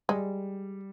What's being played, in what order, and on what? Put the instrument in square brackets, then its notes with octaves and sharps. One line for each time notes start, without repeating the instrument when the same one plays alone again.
[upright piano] G3 [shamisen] G#3